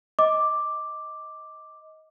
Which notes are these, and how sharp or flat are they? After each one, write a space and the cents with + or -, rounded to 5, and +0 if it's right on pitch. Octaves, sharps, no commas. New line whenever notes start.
D#5 +20 D6 +0